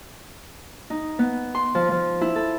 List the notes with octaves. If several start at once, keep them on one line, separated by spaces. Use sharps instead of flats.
D#4
B3
C6
F3
F3
E4
A4